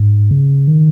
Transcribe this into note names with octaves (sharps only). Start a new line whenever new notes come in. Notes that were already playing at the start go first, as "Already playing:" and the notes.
Already playing: G#2
C#3
D#3